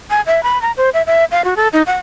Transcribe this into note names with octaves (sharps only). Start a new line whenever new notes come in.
G#5
E5
B5
A#5
C5
E5
E5
F5
F#4
A4
D#4
F#5